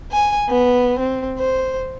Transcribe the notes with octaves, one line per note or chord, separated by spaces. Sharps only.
G#5
B3
C4
C5